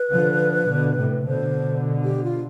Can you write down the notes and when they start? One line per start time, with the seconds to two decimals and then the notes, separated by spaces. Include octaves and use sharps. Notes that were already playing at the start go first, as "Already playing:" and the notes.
Already playing: B4
0.11 D3 F3
0.69 B2 D3
0.98 A2 C3
1.27 B2 D3 C5
2.04 G4
2.24 F4